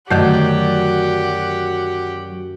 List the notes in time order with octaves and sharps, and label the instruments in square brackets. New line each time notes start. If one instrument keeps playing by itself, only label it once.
[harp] F#2 [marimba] D3 D#3 A3 [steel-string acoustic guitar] F#3 D5 [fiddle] G4 F#5